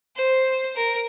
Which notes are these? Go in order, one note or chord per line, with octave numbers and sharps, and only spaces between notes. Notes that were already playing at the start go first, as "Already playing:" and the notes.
C5
A#4